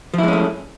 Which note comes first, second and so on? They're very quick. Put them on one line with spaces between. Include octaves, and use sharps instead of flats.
F3 E4 G#3 C#4 A3